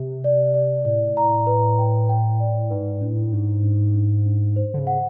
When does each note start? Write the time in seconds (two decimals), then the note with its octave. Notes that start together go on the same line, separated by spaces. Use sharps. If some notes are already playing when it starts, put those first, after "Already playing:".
Already playing: C3
0.24 D5
0.54 D5
0.85 A2 D5
1.17 A#5
1.47 B4
1.78 G5
2.09 G5
2.40 D5
2.70 G#2 B4
3.01 A2 D4
3.32 G#2 D4
3.63 D4
3.95 D4
4.26 D4
4.56 C5
4.74 D3
4.79 C#3
4.87 F#5